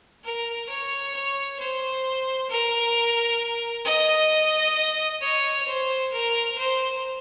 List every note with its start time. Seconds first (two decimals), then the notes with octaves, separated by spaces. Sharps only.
0.24 A#4
0.69 C#5
1.14 C#5
1.59 C5
2.49 A#4
3.85 D#5
5.21 C#5
5.67 C5
6.12 A#4
6.57 C5